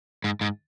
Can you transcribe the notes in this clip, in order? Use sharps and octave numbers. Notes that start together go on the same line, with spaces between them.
G#2
G#2